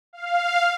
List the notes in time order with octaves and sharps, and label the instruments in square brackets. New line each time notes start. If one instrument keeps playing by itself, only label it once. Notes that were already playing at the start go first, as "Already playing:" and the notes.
[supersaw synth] F5